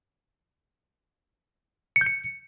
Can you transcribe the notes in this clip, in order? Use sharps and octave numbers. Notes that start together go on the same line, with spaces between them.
C#7
G6
C#7